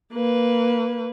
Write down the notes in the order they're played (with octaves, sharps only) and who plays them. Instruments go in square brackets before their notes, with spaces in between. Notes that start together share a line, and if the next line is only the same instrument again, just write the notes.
[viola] A#3 B4